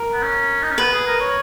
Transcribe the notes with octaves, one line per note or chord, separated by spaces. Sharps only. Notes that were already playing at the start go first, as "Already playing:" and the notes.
Already playing: A#4
B3
C#4
D#4
C#4
B3 B4
G#4
A#4
C#5